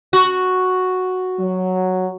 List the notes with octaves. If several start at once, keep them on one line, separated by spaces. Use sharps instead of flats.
F#4
F#3